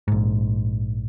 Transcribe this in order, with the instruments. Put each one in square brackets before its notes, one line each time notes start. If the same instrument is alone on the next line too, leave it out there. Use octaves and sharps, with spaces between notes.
[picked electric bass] A#1 G#2